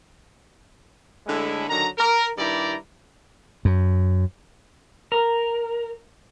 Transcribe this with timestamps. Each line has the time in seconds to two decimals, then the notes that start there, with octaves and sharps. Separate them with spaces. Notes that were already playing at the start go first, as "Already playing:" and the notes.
1.27 D3 G#3 A3 C#4 E4
1.69 D3 D#3 F#3 A#5
1.98 A#4
2.38 G2 D#3 E4 G4 D5 A#5
3.65 F#2
5.12 A#4